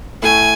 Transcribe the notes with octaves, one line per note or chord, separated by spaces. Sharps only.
A2 A3 G#5